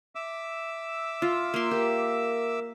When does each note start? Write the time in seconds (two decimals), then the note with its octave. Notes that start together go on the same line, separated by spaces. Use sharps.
0.15 E5 D6 E6
1.22 F4
1.54 A#3 F4 C6
1.71 G4 A#4